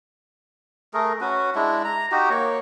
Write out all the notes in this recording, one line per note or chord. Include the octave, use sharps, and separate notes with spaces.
A3 G#4 A#4
C#4 F#4 B4
G#3 D4 E4
A#5
D#4 F#4 G4
A#3 C#5